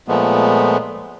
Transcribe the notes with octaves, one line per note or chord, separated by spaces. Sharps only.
A#2 F3 G#3 A3 B3